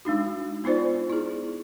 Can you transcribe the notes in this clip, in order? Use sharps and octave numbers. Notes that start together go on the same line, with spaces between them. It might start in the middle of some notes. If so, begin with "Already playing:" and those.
G#3 D4 D#4 F#4
B3 D#4 F4 C5 D5
E4 G#4